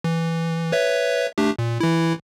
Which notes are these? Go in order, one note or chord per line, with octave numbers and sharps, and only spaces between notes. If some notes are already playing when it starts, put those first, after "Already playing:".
E3
B4 C#5 E5
A3 D4 G4
A#2
E3 E4